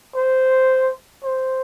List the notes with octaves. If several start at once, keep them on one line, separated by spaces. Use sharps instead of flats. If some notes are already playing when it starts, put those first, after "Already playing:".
C5
C5